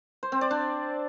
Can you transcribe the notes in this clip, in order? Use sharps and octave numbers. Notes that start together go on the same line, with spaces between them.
C5
C4
D5
D4